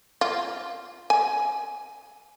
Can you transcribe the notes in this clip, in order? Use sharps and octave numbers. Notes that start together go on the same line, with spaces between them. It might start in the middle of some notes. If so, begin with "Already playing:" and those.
F4
G#5